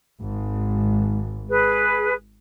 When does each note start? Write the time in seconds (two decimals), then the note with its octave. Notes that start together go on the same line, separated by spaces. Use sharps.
0.20 G#1
1.49 G#4 B4